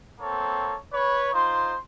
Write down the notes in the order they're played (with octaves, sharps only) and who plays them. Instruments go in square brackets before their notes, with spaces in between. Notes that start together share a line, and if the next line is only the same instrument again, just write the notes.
[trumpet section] A#3 C4 A4 C#5
B4 C#5
D#4 F4 C5 C6